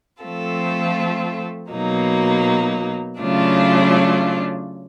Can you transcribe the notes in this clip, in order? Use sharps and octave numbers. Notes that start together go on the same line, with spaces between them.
F3 A3 C4 F4 A4
B2 F#3 A#3 D#4
C#3 F#3 A3 D4 F4